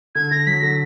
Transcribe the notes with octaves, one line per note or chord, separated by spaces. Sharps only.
D3 G#6
D3 A#6
F#3 B6
D3 A#6